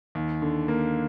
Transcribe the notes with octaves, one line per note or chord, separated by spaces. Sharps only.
D#2
D3
A#3